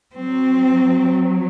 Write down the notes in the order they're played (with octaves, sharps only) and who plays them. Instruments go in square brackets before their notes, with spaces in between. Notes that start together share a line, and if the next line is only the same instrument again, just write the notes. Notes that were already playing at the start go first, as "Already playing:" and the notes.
[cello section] F#3 [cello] C4